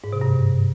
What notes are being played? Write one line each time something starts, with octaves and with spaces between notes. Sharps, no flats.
G#2
C3
G2